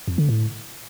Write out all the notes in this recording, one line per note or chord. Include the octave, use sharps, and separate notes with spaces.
F2
D3
A2